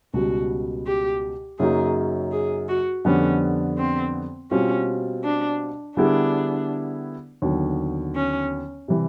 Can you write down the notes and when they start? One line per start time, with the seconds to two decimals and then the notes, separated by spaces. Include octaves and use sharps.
0.14 C#2 B2 G3 F#4
0.86 G4
1.59 F#2 C#3 F#3 A#3 D#4 G#4
2.32 G#4
2.69 F#4
3.05 F2 D3 G3 B3 C#4 D4
3.78 C4
4.51 B2 G3 C4 C#4 F4
5.24 D4
5.97 D3 G3 B3 D4 E4 G#4
7.42 D#2 D3 F#3 B3
8.15 C#4
8.88 C3 E3 G3